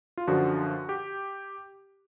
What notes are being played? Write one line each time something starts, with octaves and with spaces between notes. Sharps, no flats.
F4
F#2 D3 F3 F#4
G4